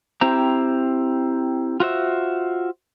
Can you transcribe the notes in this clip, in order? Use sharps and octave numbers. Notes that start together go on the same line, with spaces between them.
C4 E4 G4 C5 A#5
F4 F#4 C5 E5